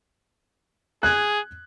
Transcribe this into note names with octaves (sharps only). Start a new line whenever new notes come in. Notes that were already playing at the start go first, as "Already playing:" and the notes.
G#4 F#6 G#6